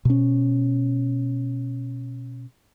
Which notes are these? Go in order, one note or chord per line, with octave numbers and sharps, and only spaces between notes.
B2 C#4